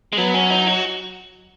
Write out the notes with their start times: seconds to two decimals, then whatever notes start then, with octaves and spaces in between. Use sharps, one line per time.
0.13 G#3
0.17 F#3 B3
0.34 C#4
0.50 D#4
0.67 F#4